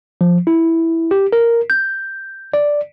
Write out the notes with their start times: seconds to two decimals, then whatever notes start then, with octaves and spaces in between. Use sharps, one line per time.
0.21 F3
0.47 E4
1.11 G4
1.33 A#4
1.70 G6
2.54 D5